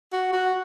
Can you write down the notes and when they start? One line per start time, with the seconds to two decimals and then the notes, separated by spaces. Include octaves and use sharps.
0.13 F#4
0.33 F#4